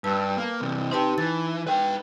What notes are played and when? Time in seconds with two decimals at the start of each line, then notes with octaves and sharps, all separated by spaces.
0.04 G2 B4 A5 E6
0.37 A#3
0.61 C3 E3
0.91 D#4 G4 B4 C5 A5
1.18 E3 A6
1.67 B4 G5